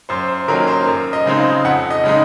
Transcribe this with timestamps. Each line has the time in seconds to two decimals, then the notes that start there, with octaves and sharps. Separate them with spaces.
0.09 F#2 C5
0.28 C5
0.48 D#3 F#3 A#3 C#4 A#4
0.67 C5
0.87 F#2 A#4
1.13 D#5
1.25 C#3 G#3 C4 D#4
1.39 F5
1.64 F2 F#5
1.91 D#5
2.04 C#3 G#3 D#4